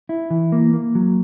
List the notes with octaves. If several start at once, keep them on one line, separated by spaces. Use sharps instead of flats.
E4
E3
A#3
A#3
F#3